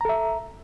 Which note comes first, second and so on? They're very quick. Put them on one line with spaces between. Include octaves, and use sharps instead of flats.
A#5 A4 E5